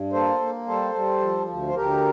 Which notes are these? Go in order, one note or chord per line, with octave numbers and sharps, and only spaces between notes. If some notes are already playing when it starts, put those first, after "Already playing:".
Already playing: G2
A#3 A4 C5
A#3
G3 A4 C5
G3
F3
D2
C5
D2 G4 A#4